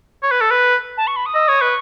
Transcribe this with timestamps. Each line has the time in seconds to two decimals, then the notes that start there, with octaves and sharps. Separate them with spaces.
0.23 C#5
0.31 B4
0.41 A4
0.51 B4
0.97 A5
1.07 C#6
1.16 B5
1.26 D#6
1.35 D#5 E6
1.47 C#5 D#6
1.60 B4 C#6